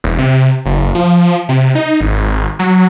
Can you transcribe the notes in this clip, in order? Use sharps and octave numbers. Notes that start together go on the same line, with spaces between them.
E1
C3
F#1
F3
C3
D#4
G#1
F#3